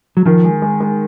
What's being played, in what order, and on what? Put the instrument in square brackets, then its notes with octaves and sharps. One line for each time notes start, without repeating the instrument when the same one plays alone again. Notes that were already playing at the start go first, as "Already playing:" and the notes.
[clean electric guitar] F#3
[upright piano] D#3 [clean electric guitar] F3
[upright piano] G#3
G#3
G#3